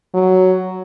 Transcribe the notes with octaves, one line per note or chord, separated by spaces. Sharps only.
F#3